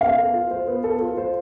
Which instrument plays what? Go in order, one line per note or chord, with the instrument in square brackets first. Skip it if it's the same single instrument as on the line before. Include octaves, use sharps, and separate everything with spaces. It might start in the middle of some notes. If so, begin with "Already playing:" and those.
[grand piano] B3 [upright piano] F5
[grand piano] A4
F4
C5
B3
A4
F4
C5